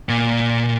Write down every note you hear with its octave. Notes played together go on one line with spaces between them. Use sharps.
A#2